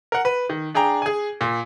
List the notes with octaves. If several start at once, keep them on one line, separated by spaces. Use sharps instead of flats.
A#4 F#5
B4
D#3
D4 G#4 G5 A#5
G#4 G#5
A#2